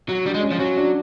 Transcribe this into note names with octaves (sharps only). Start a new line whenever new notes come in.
F#3
G3 D4
G#3
C#4
F3
F#3 C#4
D4